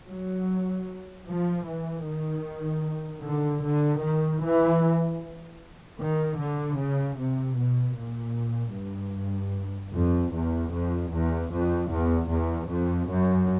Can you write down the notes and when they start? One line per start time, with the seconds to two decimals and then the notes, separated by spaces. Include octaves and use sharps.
0.09 F#3
1.28 F3
1.67 E3
2.06 D#3
3.24 D3
3.64 D3
4.02 D#3
4.43 E3
6.00 D#3
6.40 D3
6.78 C#3
7.18 C3
7.57 B2
7.97 A#2
8.75 G2
9.93 F2
10.33 E2
10.72 F2
11.11 E2
11.51 F2
11.90 E2
12.29 E2
12.68 F2
13.08 F#2